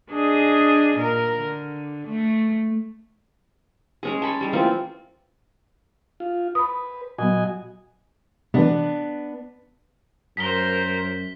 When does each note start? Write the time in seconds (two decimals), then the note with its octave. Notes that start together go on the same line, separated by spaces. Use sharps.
0.11 D4 G#4 D#5
0.97 A#2 A#4
1.40 D3
2.08 A3
4.03 G#3 C#4 G#4
4.22 A5 B5 C#6
4.41 G3 G#3
4.53 E3 A#3 C4 F4
6.20 F4
6.55 B4 B5 D#6
7.19 A#2 F#3 B3 F#4 D#5 G#5
8.54 C3 E3 B3 D4
10.37 F#2 A#4 C5 B6 G7